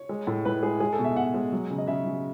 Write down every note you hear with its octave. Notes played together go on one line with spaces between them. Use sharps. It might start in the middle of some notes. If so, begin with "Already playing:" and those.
Already playing: C#5
G#3
A2
A2 B4
G#3 G#4
G#3 G#4
A4
B2
E5
B2 F#5
G#3
F#3
C#3
D#5
C#3 E5
F#3